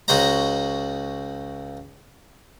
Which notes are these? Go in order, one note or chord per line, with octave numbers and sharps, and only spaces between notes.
C#2 F#4 C5 D#5 A#5